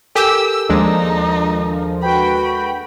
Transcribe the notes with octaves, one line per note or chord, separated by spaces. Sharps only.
G4 A4 A#4 G#5 E6
D#2 F3 G#3 D4 D#4
F#4 B4 G5 B5